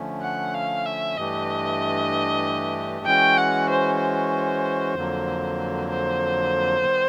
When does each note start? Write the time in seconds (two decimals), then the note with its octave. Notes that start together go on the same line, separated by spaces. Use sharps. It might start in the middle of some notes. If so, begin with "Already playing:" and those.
Already playing: D3 F3 A3 C#4
0.22 F#5
0.54 F5
0.86 E5
1.17 G2 E3 A3 D4 G4 D#5
3.06 E3 G#3 C#4 F#4 G5
3.38 F#5
3.70 C5
4.00 C5
4.95 F2 D3 F#3 A#3
5.90 C5
6.84 D#3 G3 B3